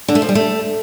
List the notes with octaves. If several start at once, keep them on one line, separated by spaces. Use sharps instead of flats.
D3
A3
F3
G3
A3